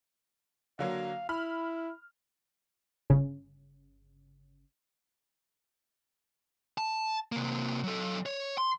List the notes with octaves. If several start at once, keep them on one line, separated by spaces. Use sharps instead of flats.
D3 F#3 A#3 F5
E4 B5 F6
G1 C#3
A5
C3 A#3
F#3 A4
C#5
C6